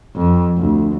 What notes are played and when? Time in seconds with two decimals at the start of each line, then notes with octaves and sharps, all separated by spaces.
0.16 F2
0.58 D2